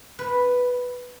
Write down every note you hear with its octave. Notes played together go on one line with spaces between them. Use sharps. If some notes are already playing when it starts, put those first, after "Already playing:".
B4